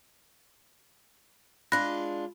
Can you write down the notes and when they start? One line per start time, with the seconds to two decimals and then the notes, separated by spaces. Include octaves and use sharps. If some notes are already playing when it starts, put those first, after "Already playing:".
1.72 G#3 D4 F4 B5 F#6 A#6